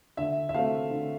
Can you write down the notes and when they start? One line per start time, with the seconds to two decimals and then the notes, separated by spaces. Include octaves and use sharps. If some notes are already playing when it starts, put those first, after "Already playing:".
0.17 D3 E5
0.49 E5
0.54 A3 C4 F5
0.90 D3